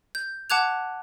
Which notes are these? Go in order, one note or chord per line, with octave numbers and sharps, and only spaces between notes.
G6
F#5 A5 D6 F#6 G#6 F7